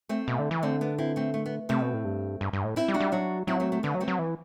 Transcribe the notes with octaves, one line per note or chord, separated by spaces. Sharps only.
A3 C4
B2
D3
E3
D3 A3 C4
B3 D4
C4 E4
A3 C4
A3
B3
C3 A3 C4
B2
A2
G2
G2
G2
A2
C4 E4
G3
D4 F#4
G3
F#3 D4 F#4
F#3 C4 E4
A3 C4
A3 C4
D3 B3
F#3
A3 C4
F#3
E3